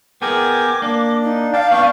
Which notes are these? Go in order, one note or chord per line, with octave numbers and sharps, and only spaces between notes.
B3 G#4 A#4 G5 G#5 D6
A#3 D4
D#4
D5 F5 G5 A5
B3 D4 C#6